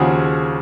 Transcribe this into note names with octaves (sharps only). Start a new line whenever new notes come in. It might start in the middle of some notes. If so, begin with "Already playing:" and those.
Already playing: D#2 C#3 F3 F#4 G#4